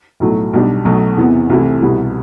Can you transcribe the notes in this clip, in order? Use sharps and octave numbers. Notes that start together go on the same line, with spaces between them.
B1 A2 F#3 A3
B1 B2 G3 D4
B1 B2 F#3 A3
E2 C3 E3 B3
C2 C3 E3 A3 E4
C2 B2 G3 B3 E4